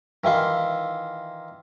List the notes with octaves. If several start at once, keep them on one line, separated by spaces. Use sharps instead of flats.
D#3 E3 E4 F4